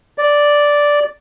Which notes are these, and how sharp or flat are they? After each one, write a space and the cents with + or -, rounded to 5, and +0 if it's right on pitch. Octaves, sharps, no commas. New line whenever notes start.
D5 -5